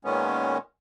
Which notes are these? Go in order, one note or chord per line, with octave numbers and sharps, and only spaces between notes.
A#2 D#3 G#3 B3 C#4